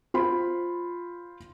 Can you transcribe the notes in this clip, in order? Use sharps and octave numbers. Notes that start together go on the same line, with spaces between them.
F4 C5 B5 C6